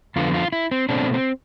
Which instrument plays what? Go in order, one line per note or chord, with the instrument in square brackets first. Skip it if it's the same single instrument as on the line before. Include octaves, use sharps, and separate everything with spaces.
[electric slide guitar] F2 D3 F3 B3 F4
F4
E4
C4
B2 A3 C4 D4
C4